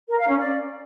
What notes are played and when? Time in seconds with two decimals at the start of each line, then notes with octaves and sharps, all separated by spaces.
0.09 A#4
0.18 F5
0.28 C#4
0.38 D5